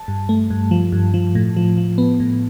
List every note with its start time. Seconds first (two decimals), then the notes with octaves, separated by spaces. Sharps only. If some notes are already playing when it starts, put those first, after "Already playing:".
Already playing: A5
0.08 G2
0.29 A3
0.50 G2
0.71 F3
0.92 G2
1.14 F3
1.35 A2
1.57 F3
1.77 F3
1.98 B3
2.20 A2